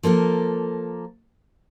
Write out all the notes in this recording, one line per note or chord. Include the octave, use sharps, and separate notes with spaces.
F3 A#3 A4 A#4